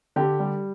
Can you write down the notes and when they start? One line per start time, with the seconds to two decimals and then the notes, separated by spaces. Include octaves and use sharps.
0.16 D3 G4
0.40 G3